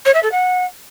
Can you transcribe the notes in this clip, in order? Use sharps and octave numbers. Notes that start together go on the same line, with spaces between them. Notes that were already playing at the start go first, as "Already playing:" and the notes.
C#5
E5
A4
F#5